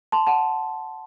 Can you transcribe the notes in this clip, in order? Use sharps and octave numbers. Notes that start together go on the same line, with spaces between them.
A5 C6
F#5 A5